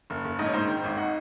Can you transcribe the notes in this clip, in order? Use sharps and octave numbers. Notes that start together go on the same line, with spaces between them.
F#1
F#1
G#2 D#5
C#5
G#2 C5 D#5
D#3
G#1
D#5 F#5